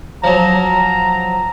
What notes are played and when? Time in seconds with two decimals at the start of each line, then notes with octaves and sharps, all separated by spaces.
0.24 F3 F#3 A#5